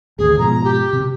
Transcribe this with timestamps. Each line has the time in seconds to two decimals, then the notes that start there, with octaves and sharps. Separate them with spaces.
0.19 G#1 D2 G#4
0.39 G#2 B2 F3 A#5
0.64 G4
0.93 C3